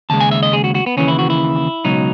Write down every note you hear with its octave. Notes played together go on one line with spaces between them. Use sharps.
D#2 C#3 G#3 A5
G#5
E5
D#5
G#4
F#4
F#4
B3
D#2 C#3 E3 C#4
E4
F#4
E4
C#2 B2 F#3 D#4